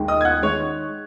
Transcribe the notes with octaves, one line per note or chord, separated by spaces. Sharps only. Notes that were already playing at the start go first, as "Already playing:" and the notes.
Already playing: D#2 D#3 G#3
D#5 D#6
G#6
F#5 F#6
D#3 G#3 C#5 C#6